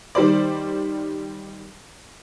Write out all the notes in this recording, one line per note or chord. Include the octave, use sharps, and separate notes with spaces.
D#3 G3 C5 D5